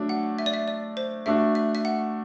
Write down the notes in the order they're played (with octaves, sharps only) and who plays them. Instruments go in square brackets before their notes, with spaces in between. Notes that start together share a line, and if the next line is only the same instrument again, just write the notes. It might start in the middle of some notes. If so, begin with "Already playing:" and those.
Already playing: [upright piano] F#3 A3 D4
[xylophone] F#5
E5
D5
E5
D5
C5
[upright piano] A3 D4 F#4 [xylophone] E5
[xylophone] E5
E5
F#5